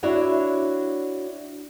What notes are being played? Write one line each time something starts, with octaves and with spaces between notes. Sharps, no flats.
D4 E4 F#4 C#5 F#5